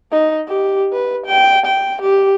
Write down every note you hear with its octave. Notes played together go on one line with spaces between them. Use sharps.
D#4
G4
B4
G5
G5
G4